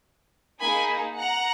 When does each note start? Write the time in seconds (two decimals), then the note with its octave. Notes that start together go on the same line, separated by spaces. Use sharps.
0.61 A#3 D#4 G#4 G#5 B5
1.18 F#5 A#5